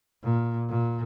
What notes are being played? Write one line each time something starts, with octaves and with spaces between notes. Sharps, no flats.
A#2
A#2